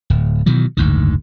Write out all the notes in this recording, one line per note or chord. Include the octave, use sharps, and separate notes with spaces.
D1
B2 D#3 E3 F#3
F#1 D2 G#2 D#3